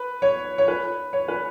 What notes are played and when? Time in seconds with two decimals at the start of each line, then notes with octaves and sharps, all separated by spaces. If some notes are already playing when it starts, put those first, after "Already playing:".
Already playing: B4
0.22 C#5
0.58 C#5
0.68 B4
1.13 C#5
1.28 B4